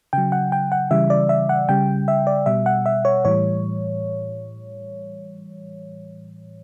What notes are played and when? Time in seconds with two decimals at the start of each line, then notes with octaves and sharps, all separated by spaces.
0.13 C#3 F#3 G5
0.32 F#5
0.52 G5
0.72 F#5
0.91 C#3 E3 G3 E5
1.10 D5
1.29 E5
1.49 F#5
1.69 C#3 G3 G5
2.08 E5
2.27 D5
2.46 B2 G3 E5
2.66 F#5
2.86 E5
3.05 C#5
3.25 A2 E3 G3 C#5